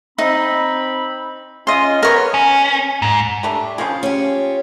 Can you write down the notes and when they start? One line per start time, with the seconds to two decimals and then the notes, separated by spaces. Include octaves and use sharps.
0.18 C4 D#4 B5
1.67 C#4 F4 D#5 C6
2.03 B3 A#4 B4 C#5
2.34 C#4
3.02 G#2
3.43 G3 A3 D4
3.78 C#3 F3 F4 G#4
4.03 C#4 F4 G4